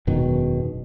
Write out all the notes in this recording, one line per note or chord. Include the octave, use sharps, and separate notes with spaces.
E1 F#2 B2 D#3